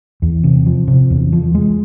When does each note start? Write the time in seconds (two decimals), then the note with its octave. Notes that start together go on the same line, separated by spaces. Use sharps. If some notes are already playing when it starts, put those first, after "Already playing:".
0.22 E2
0.44 C3
0.66 F3
0.87 C3
1.10 E2
1.32 F3
1.55 G#3